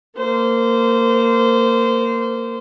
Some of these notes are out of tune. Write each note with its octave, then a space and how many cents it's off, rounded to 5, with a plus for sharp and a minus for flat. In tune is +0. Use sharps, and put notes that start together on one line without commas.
A#3 -20 C5 -20